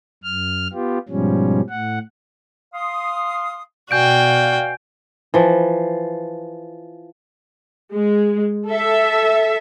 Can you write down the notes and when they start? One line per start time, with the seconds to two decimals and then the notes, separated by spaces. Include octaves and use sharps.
0.24 F#2 F6
0.73 B3 F4 G4
1.09 G#2 B2 F3 G3 C#4
1.70 A2 F#5
2.74 F5 C6 D#6
3.91 B2 F#4 D5 F5 G5 G#5 G6 D7
5.34 E3 F3
7.94 G#3
8.67 A4 E5